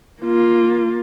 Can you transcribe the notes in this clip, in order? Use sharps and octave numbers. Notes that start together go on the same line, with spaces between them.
A#3 F4